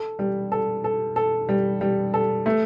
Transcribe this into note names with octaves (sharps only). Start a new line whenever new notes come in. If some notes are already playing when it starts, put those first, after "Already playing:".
Already playing: A4
G3
A4
A4
A4
G3
G3
A4
A3